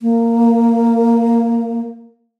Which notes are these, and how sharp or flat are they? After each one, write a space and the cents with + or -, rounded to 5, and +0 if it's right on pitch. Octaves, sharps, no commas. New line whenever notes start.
A#3 -10